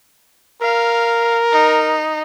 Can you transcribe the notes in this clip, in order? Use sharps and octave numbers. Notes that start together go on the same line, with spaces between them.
A#4 F5
D#4